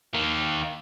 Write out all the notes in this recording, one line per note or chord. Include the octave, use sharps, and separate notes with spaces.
D#3 A#3